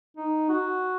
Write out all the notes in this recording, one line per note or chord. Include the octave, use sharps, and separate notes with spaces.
D#4
F#4